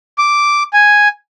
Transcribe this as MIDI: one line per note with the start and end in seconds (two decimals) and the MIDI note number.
0.18 0.63 86
0.73 1.08 80